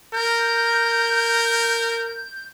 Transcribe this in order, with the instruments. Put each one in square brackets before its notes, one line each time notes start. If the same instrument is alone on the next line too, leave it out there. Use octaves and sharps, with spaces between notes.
[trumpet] A#4 [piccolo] G6